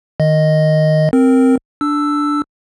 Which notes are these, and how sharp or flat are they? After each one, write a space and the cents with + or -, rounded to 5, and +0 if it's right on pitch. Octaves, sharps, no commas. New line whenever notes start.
D#3 -10 D#5 +0
C4 +0 A#4 +0
D4 +0 E6 +5